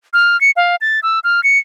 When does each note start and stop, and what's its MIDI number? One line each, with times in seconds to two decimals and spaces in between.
0.13 0.39 89
0.41 0.51 97
0.57 0.76 77
0.81 1.00 93
1.03 1.20 88
1.24 1.43 89
1.44 1.58 97